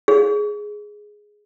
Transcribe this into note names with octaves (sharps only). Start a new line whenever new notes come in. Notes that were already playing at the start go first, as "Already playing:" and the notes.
G#4